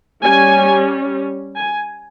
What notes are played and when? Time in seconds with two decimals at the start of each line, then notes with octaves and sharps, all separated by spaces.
0.23 G3 C#4 G#5
1.56 G#5